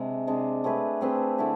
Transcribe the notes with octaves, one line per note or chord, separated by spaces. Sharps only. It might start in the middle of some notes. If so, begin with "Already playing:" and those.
Already playing: C3 G#3 D4
C3 G#3 D4
A3 C4 G#4 B4
A3 C4 G#4 B4
D3 A3 E4 B4